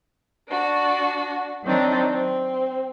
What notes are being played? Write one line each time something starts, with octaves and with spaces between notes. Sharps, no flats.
D4 F#4
D#3 F#3 C4 D4 D#4
C4